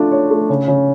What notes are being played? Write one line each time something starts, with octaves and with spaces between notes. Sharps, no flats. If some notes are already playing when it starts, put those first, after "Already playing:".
Already playing: A3 D4 F4
C#5
A3
C#3
C#3